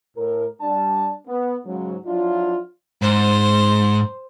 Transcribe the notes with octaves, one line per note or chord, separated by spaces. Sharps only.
A2 A#4
G3 D4 A5
B3
G#2 C#3 F#3
F3 F#3 D4 E4 F4
G#2 C5